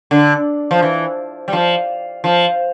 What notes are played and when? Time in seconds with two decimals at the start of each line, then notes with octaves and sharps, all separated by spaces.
0.11 D3
0.71 F3
0.82 E3
1.48 G3
1.53 F3
2.24 F3